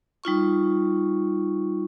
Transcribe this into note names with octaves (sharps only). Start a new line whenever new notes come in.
G3 D#4 F4 C#6